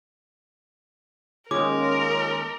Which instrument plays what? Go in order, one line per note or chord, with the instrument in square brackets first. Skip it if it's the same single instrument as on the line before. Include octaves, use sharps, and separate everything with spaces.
[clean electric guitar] D#2 G#3 [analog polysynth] C#4 F4 G#4 [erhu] A#4 [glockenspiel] D6